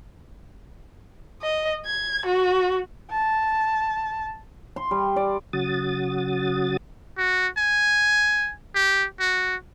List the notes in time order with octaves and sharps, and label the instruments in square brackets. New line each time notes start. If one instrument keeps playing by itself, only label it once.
[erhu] D#5
G#6
F#4
[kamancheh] A5
[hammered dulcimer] C6
G3
D5
[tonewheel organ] C#3 F#3 F#4 D#6 A6
[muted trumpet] F#4
G#5
G4
F#4